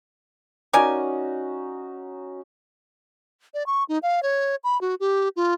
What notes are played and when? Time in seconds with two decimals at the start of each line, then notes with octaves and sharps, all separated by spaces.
0.73 C#4 D#4 F#4 A#4 D5 G#5
3.54 D5
3.67 C#6
3.89 D#4
4.03 F5
4.23 C#5
4.64 B5
4.81 F#4
5.00 G4
5.36 F4